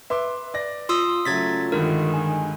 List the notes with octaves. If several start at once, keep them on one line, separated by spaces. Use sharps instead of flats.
B4 E5 C6 D6
D5 A#6
F4 C6 D#6 E6
C#3 F#3 A3 G#6 A6 B6
G2 D3 D#3 G#3 A#4
G#5